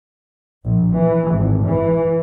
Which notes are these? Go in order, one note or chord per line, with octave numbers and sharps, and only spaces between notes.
A#1
E3
G#1
E3